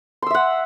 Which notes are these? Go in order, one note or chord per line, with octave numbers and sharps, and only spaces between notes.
E5 F#5 C6 E6